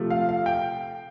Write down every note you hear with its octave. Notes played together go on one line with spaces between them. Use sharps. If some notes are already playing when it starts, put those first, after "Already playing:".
Already playing: C3 F3 A3
F5
F5
G5